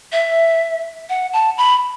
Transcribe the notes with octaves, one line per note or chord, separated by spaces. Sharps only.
E5
F#5
A5
B5